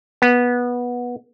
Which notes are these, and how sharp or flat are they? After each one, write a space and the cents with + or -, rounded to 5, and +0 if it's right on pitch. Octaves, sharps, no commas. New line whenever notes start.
B3 -15